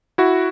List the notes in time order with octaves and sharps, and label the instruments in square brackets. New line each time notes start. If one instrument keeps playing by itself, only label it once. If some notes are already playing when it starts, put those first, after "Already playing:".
[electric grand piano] E4 F#4